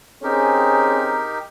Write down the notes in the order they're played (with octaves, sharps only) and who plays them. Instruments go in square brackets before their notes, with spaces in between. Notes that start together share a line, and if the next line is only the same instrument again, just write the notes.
[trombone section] C4 C#4 G#4 [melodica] D#4 G4 A#4